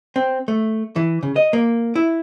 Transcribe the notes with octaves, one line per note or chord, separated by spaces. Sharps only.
C4
A3
E3
C#3
D#5
A#3
E4